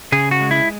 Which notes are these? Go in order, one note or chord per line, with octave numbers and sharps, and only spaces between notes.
C#3 G#4
F#4
G#3
E4